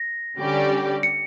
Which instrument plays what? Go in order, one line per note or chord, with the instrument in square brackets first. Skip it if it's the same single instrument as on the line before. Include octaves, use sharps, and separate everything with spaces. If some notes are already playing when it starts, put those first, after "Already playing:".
Already playing: [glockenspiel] A#6
[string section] D3 G3 C#4 G4 D5
[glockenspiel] C#7